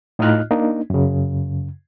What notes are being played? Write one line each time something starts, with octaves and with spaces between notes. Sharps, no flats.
A2 D#4 F4 D#5 F6 F#6
A#3 D4 D#4
F#2 C#3